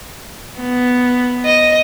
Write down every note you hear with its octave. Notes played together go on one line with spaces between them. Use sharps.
B3
D#5